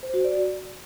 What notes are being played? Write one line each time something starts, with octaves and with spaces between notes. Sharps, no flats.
C5
F#4
D5